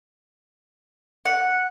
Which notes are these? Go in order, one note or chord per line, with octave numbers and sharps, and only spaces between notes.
F#5